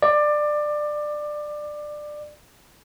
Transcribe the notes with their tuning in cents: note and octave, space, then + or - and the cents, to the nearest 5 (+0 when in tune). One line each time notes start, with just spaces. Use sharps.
D5 +20